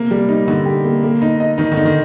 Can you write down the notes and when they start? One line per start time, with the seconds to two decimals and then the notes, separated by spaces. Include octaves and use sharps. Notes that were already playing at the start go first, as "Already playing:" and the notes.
Already playing: C3 A#3
0.11 G3
0.29 D#4
0.47 D3 D#4
0.66 G4
0.84 A#3
1.03 A#3
1.22 D#4
1.40 D#5
1.58 D#3 D#4
1.72 D3
1.77 D#4
1.85 D#3